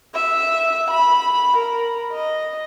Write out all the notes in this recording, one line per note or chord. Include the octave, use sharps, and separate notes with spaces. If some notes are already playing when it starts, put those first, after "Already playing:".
E5
B5
A#4
D#5